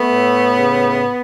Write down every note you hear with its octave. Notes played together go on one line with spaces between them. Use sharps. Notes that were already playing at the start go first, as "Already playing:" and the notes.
Already playing: A3 B3
A2
C#3